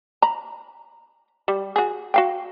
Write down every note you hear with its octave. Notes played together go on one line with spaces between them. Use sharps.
A#5 B5
G3
F#4 G#4
F#4 F5 G5